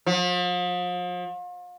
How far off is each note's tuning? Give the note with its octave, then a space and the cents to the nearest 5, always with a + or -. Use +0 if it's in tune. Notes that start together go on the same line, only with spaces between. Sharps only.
F3 +40